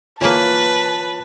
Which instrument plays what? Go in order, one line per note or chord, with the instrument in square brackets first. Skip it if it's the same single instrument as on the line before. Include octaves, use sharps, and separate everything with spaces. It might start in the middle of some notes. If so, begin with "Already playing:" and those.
[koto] E3 A#3 [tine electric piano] F4 C#5 [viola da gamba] B4 [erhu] A5